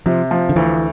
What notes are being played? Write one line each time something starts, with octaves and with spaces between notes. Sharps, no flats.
C3 F3
F3
D3
D2 E3